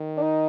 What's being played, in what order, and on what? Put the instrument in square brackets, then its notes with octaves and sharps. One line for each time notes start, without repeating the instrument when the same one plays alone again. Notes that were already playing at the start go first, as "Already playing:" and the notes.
Already playing: [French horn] D#3
[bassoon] D4
D#4